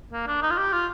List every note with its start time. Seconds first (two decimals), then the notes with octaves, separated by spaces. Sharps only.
0.13 A#3
0.27 D4
0.43 D#4
0.51 F4
0.58 G4
0.73 F4